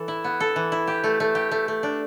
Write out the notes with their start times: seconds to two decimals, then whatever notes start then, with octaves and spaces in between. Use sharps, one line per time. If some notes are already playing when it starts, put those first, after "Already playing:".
Already playing: E3 A4
0.08 E4
0.24 B3
0.40 A4
0.56 E3
0.72 E4
0.87 G4
1.04 A3
1.20 A3
1.35 G4
1.51 A3
1.68 A3
1.83 D4